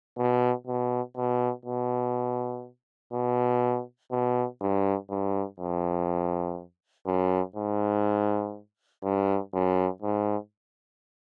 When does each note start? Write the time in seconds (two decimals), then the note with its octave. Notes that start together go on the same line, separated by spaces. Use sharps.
0.18 B2
0.67 B2
1.17 B2
1.65 B2
3.13 B2
4.12 B2
4.61 G2
5.10 G2
5.60 F2
7.07 F#2
7.56 G#2
9.04 G2
9.54 F#2
10.02 G#2